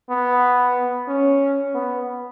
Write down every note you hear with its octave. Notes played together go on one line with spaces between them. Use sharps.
B3
C#4
B3